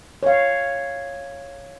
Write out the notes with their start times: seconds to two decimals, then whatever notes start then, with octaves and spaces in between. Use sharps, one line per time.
0.23 C#5 F5